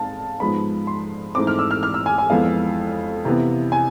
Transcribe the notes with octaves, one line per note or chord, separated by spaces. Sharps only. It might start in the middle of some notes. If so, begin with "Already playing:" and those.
Already playing: G#2 G#3 C4 F5 A5
G#2 F3 G#3 B3 B5
C6
G#2 E3 A3 C4 D6
F6
E6
F6
F6
E6
G#5
G#5
F2 E3 G#3 B3 F5
C3 E3 B3
G#5